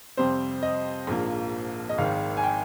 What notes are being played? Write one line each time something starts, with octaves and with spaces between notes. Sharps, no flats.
F2 C3 G3 C4 C5
D#5
A#1 G#2 F3 A#3
D#5
G#1 G#2 D#3 F5
G#5
G5